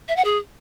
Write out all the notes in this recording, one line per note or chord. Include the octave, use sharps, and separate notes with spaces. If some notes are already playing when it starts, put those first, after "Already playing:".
E5
F#5
G#4